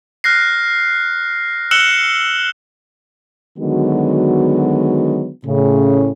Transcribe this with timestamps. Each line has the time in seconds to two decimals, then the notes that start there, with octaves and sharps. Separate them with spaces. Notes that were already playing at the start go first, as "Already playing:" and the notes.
0.24 F6 F#6 A#6 C7
1.71 E6 F#6 C#7 E7 F#7 G7
3.59 D3 D#3 F#3 G#3 B3 F#4
5.46 A2 C#3